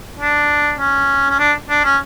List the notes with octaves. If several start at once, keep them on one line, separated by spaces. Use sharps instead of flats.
D4
C#4
C#4
D4
D4
C#4